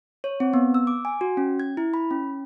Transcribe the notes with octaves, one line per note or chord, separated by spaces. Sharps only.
C#5
C4
B3
E6
D6
G#5
F#4
C#4
G#6
E4
B5
C#4